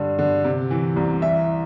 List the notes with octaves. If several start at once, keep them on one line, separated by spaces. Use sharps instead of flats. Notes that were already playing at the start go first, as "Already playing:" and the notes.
Already playing: G2 D3
D3
C3
E3
C2
E3 E5